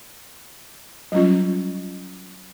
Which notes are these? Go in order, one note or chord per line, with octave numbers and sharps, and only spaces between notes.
F#3 G3 C#4 F4